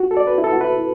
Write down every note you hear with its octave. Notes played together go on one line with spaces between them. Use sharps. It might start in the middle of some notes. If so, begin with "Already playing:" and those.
Already playing: F#4
A4
D5
B4
E4
A4
F#4
E4 B4